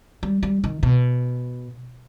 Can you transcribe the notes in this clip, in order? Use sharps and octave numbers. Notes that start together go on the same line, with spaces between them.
G3
G3
D#3
B2